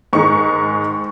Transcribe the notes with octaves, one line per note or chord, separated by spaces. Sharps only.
G#2 D#3 G#3 C#6